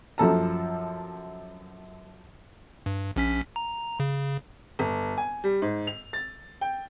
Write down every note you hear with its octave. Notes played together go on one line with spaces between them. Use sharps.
F#2 F3 A4 A#5
G2
A#1 C#4 B6
A#5
C#3
G1
G#5
G3
G#2
F7
A6
G5